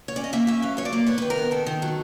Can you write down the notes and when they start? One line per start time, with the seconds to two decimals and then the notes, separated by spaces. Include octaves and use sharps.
0.08 C#5
0.16 C#4 D5
0.24 D#5
0.33 A#3 E5
0.47 C#4 E5
0.62 F#3 F5
0.77 F#3 C#5
0.85 D5
0.93 A#3
1.06 B3 C#5
1.18 D#3 B4
1.30 A#4
1.38 B3
1.51 D#3 A4
1.66 D#3
1.82 F#3